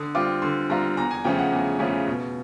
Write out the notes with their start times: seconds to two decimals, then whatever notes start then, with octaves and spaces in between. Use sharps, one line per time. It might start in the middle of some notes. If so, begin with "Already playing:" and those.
Already playing: D3 D#6
0.15 G3 C4 F4 D6
0.42 D3 C6
0.70 G3 C4 F4 A#5
0.97 E2 A#5
1.11 G#5
1.24 C#3 F3 A3 C#4 G5
1.39 F#5
1.52 E2
1.79 C#3 F3 A3 C#4
2.07 B2